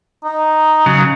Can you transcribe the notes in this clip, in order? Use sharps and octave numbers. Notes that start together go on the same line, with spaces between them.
D#4
C#3 F#3